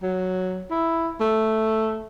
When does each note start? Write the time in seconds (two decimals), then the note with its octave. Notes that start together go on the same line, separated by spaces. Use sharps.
0.02 F#3
0.71 E4
1.20 A3